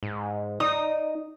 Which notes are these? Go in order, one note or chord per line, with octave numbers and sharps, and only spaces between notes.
G#2
D#4 D5 D#6